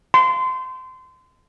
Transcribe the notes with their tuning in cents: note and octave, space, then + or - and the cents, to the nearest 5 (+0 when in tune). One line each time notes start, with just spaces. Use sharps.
C6 -25